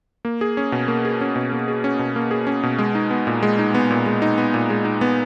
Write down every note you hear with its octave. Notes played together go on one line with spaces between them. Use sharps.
A#3
G#4
C#4
B2
A#3
G#4
C#4
B2
A#3
G#4
C#4
B2
A#3
G#4
C#4
B2
G#3
D#4
B3
A#2
G#3
D#4
B3
A#2
G#3
D#4
B3
A#2
G#3
D#4
B3